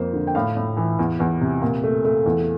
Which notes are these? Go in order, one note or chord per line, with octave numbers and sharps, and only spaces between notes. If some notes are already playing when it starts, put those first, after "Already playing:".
Already playing: F2 A#3 C5
D3
G5
A2 F5
A2
E3
E2
E2
C3
A#2
A3
A3
E2